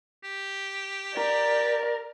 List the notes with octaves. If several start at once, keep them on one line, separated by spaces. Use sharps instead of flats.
G4
A#4 D5